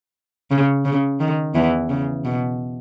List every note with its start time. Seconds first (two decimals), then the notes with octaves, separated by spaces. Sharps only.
0.51 C#3
0.85 C#3
1.20 D#3
1.55 E2 E3
1.90 C#3
2.25 B2